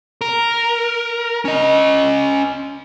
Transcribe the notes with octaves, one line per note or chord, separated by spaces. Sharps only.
A#4
C#4 D#5